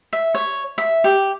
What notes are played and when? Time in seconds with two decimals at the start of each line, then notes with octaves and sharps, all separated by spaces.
0.13 E5
0.34 C#5
0.78 E5
1.04 G4